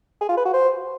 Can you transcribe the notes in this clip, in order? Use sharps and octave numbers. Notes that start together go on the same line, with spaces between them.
G#4
F4
B4
F#4
C5